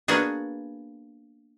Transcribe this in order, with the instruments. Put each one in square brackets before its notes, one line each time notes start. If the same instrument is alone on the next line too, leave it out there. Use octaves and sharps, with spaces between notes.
[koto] A#3 B3 D4 F#4 G#4